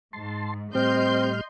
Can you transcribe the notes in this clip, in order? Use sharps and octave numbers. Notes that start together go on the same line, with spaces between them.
G#2 A5 C6
A2 G3 C4 D#5 C6 F6 G6